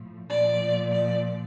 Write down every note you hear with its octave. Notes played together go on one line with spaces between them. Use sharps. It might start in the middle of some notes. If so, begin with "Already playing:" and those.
Already playing: A2 F3
A#2 F3 D5
D5